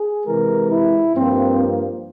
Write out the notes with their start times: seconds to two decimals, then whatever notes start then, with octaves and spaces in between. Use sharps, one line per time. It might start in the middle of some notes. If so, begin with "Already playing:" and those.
Already playing: G#4
0.25 C3 E3 G#3 A#4
0.70 E4
1.15 G2 F3 A#3 C4